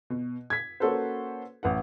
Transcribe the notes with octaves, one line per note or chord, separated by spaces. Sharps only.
B2
G#6 B6
A#3 C#4 F#4 A4 B4 C5
A1 B4 F#5